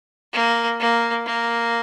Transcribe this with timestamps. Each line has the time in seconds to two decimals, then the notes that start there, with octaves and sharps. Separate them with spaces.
0.33 A#3
0.80 A#3
1.26 A#3